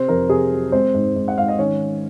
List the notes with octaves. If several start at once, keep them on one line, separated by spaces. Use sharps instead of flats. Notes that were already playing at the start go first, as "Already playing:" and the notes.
Already playing: C3 C4 C5
F2 A#4
C3 G#4
F#3
G#3 C4 C5
G#2
G#2
F#5
G#2 F5
D#5
D#3 C#4 C#5